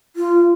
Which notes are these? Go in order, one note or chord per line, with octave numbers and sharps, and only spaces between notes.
F4